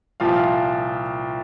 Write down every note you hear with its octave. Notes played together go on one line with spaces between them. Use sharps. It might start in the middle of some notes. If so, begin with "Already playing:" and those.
C2 A#2 F3 F5